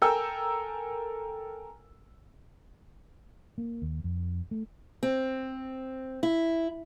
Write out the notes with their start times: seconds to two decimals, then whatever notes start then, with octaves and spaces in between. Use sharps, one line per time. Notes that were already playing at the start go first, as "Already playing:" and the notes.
0.02 A4 A#4 G5 G#5 E6
3.58 A#3
3.82 D#2
4.04 F2
4.51 A3
5.03 C4
6.23 E4